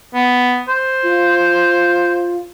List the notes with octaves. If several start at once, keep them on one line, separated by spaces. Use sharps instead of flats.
B3
C5
F4